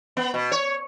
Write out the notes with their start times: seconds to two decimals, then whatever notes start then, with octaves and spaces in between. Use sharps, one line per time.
0.17 B3
0.34 B2
0.52 C#5